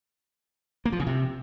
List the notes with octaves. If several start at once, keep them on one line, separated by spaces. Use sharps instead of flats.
A#3
F3
C#3
C3